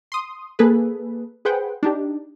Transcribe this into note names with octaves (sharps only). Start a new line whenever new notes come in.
C6 D#6
A#3 G#4 A4 B4
G#4 B4 C5 F#5 G5
D4 D#4 G4